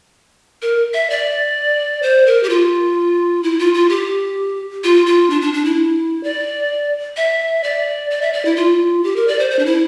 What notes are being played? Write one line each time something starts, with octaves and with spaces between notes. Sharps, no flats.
A#4
E5
D5
C5
A#4
G4
F4
E4
F4
F4
G4
F4
F4
D4
D4
D4
E4
D5
E5
D5
D5
E5
D5
E4
F4
G4
A#4
D5
C5
C5
D4
E4